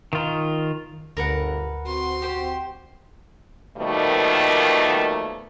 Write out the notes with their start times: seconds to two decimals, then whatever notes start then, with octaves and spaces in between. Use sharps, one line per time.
0.13 D#3 F4
1.17 G1 D2 A#4 B4 F#5
1.87 C4 F#4 C6
2.22 G4 C5
3.77 B2 D#3 F3 G3 A3 A#3